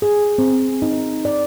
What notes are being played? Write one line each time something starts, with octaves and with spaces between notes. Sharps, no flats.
G#4
C4
D#4
D5